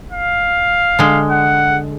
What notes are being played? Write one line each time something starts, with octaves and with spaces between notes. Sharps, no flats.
F5
D3 G#3
F#5